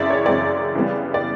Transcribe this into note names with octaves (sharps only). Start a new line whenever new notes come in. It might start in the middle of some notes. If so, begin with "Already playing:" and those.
Already playing: F#2 C#3 E3 G#3 C4 D5 E5
C#5
F#2 C#3 E3 G#3 C4 D5
C#3 E3 G3 B3
D5